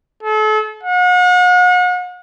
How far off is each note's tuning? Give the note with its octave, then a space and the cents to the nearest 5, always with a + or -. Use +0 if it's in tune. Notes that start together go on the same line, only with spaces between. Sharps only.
A4 -40
F#5 -40